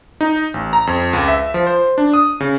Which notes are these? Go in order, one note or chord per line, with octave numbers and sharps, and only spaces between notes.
D#4
A1
A#5
F2
C#2
E5
F3
C5
D4
D#6
C#3